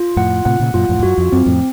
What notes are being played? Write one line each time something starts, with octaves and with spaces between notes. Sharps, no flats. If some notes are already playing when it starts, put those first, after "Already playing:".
Already playing: F4
F2 A2 F#5
A2 C3 F#5
A#2 C#3
F#2 A#2 F4
F2 A2
F2
F#2 F#4
F2
F#2 C4
F2 A2